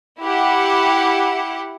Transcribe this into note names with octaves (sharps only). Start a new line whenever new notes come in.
E4 G4 F#5